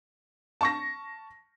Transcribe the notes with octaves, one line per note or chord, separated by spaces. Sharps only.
A5 C#6 A#6